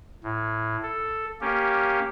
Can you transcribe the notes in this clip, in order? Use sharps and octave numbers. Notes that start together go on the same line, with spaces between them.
A2
A4
A#3 C#4 G4